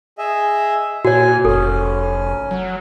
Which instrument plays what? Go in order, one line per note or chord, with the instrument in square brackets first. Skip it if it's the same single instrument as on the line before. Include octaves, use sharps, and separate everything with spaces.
[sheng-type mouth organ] G#4 D#5 E5
[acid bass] A#2 [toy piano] F#4 C#5 [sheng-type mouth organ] G#5
[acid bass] F1 [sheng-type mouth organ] C#4 [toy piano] A4
[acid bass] F#3